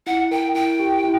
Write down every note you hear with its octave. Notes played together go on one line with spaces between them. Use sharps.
E4 F#5
A#4 G5
E4 G5
G4
E4